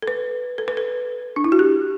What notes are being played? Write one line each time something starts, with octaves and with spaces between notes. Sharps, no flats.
A4
B4
A4
B4
A4
D4
E4
F#4
G4